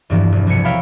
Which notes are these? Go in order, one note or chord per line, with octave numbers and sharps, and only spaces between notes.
E2 G2 E3 F3
E1
C2 G#6 C#7
A#4 C#5 E5 F5 G5 B5